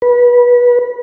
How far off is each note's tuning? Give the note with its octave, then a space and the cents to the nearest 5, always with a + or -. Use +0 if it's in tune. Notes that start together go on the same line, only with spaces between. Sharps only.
B4 -25